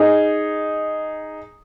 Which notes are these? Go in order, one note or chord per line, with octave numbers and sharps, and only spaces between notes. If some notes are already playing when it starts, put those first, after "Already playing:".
Already playing: D#4 G#4